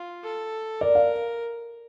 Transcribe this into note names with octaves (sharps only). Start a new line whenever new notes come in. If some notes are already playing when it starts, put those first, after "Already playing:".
Already playing: F4
A4
A#4 D5
F5